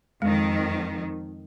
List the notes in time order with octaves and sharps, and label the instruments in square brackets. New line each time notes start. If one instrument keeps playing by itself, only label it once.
[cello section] F2 D#3 [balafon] G#3